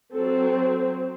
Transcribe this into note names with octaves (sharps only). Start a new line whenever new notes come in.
F#3 C4 A4